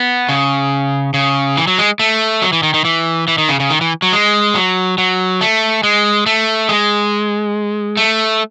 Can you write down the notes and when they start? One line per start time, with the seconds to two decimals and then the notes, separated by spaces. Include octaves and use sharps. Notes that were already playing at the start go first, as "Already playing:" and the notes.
Already playing: B3
0.29 C#3
1.14 C#3
1.57 E3
1.67 F#3
1.78 G#3
1.99 A3
2.42 F#3
2.53 E3
2.63 D#3
2.74 D#3
2.85 E3
3.28 E3
3.38 D#3
3.49 C#3
3.60 C#3
3.70 D#3
3.81 E3
4.02 F#3
4.13 G#3
4.55 F#3
4.98 F#3
5.41 A3
5.83 G#3
6.26 A3
6.69 G#3
7.97 A3